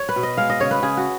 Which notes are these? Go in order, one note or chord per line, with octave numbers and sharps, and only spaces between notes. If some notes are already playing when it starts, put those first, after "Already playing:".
Already playing: C#5
B4
B2
D#5
G#3 F5
D#5
C#3 C#5
B4
C#3 G#4
F#4